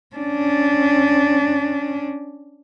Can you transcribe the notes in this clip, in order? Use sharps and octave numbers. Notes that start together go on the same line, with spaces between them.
C#4 D4